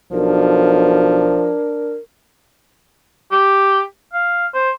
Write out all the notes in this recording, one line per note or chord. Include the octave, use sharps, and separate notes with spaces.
B1 F3 D4 A#4
G4
F5
C5